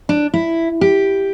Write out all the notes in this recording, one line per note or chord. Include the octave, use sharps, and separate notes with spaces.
D4
E4
G4